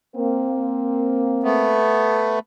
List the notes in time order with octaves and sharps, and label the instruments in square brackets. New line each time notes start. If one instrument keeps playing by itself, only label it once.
[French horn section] A#3 C4
[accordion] A3 B3